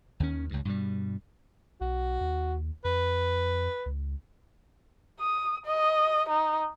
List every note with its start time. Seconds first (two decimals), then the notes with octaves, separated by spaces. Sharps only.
0.20 D#2 D#3 C#4
0.50 C#2 G2
0.65 G2 B2 G3
1.81 B1 F#4
2.21 D#2
2.85 F2 B4
3.86 C#2
5.20 D#6
5.66 D#5
6.29 D#4